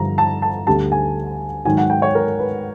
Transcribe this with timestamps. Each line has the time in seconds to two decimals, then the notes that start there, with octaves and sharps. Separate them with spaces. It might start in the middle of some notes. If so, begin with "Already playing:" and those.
Already playing: G2 D3 F3 A#5
0.18 A5
0.42 A5
0.67 D2 D3 G3 A5
0.92 G#5
1.65 G#2 D#3 F#3 G#5
1.78 F#5
1.90 G5
2.02 C#5
2.15 A#4
2.39 B4